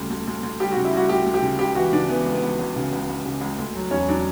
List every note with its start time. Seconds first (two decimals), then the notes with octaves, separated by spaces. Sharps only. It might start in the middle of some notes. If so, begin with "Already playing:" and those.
Already playing: D2 C#3 G3
0.10 D2
0.27 D2
0.43 D2
0.60 G3 G4
0.72 C#3 F#4
0.85 E4
0.93 G3 F#4
1.09 D2 G4
1.26 D2
1.34 G4
1.42 C#3
1.59 C#2 G4
1.75 E3 F#4
1.93 C#3 D4
2.09 E3 B3
2.26 C#2
2.34 B3
2.43 C#2
2.59 C#2
2.76 C#3
2.92 C#2
3.08 C#2
3.25 C#3
3.41 C#2
3.58 D2
3.75 F#3
3.91 E1 C#4
4.08 F#3 D4